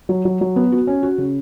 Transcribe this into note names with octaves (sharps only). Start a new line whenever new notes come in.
F#3
F#3
F#3
B3
F#4
C#4
F#4
C#3